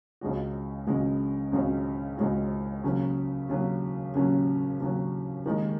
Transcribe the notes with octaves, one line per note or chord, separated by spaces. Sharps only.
C#2 C#3 G#3 C#4 F#4
C#2 C#3 G#3 C#4 F#4
C#2 C#3 G#3 C#4 F#4
C#2 C#3 G#3 C#4 F#4
D#2 C#3 F#3 C#4
D#2 C#3 F#3 C#4
D#2 C#3 F#3 C#4
D#2 C#3 F#3 C#4
D#2 D#3 G#3